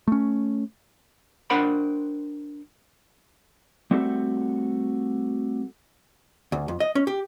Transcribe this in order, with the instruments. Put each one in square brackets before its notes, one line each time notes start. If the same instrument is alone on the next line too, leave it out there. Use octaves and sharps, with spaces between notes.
[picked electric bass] A3 C#4
[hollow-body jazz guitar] D4 A#4 C5 F#5 G5 B5
[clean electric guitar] G3 A3 C4 F#4 G4 A4
[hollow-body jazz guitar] D2
F2
D#5
C#4
G4